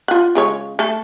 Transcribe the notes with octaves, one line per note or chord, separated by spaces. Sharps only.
F4 F#5
C#3 G#3 C#5
A3 A4